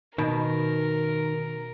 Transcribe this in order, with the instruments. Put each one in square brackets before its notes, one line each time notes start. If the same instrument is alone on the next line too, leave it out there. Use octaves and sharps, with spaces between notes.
[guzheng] B2 [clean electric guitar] D#3 [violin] A#4